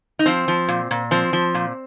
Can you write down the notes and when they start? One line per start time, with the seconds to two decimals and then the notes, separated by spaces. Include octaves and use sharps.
0.19 D#4
0.26 F3 C4
0.48 F3
0.68 A#2
0.91 A#2
1.11 F3 C4
1.33 F3
1.54 A#2